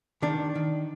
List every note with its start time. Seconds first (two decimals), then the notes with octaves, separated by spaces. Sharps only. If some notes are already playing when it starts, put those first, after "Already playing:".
0.22 D#3 D4
0.55 D#3